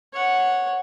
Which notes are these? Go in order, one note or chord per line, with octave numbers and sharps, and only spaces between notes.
C#5 F#5